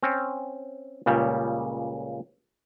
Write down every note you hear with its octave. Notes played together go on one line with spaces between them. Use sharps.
C4 C#4
C#2 A#2 C#3 G3